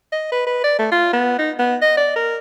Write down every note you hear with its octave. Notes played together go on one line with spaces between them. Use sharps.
D#5
B4
B4
D5
A3
F4
B3
D#4
B3
D#5
D5
A#4